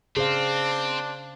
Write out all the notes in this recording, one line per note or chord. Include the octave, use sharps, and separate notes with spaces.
C#3 C4 D4 G#4 C5 F5